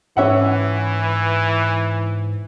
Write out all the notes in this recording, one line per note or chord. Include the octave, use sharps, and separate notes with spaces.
G#2 E3 C#4 E5 F#5